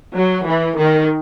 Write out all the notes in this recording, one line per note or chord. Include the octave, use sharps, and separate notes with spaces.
F#3
E3
D#3